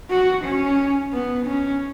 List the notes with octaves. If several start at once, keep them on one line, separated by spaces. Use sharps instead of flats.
F#4
C#4
B3
C#4